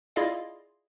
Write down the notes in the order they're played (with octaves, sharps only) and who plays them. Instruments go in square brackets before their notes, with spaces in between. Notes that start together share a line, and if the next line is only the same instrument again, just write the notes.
[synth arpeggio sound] E4 F4 G#4 D5 D#5 F5